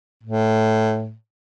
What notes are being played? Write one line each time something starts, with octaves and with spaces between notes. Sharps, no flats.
A2